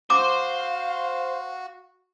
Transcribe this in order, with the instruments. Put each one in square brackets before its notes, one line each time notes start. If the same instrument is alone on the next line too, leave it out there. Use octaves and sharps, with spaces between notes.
[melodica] F#4 [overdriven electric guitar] C5 [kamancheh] F5 [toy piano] D6